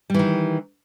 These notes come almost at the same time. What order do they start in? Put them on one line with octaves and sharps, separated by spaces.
G3 E3 D#3